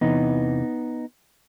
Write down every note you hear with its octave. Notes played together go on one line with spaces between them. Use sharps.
E2 C3 E3 B3 D#4